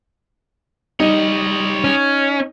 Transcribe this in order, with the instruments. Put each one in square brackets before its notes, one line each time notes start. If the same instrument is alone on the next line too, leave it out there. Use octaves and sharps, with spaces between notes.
[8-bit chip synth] G3 [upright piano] D#4 [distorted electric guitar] C#5 D#5
[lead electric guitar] C#4